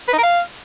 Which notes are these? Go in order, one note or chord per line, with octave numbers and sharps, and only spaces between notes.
B4
D#4
A#4
F5